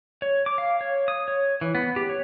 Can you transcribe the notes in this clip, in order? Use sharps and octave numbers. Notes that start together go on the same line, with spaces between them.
C#5
D6
F5
C#5
D#6
C#5
E3
B3
G4
C#5